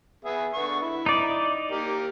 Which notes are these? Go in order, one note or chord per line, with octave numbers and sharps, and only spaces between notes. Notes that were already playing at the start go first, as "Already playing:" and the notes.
B3 G#4 E5
D3 B3 C#6
E4
D#4 D5
A#3 G4 A#4